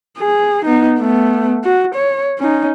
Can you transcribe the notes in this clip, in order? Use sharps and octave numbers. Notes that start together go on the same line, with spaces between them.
G#4
B3 D#4
A3 B3
F#4
C#5
C#4 D#4